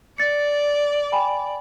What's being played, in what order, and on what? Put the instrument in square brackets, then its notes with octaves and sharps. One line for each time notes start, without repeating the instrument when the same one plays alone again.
[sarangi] D5 [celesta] A6 C#7
[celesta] G5 G#5 B5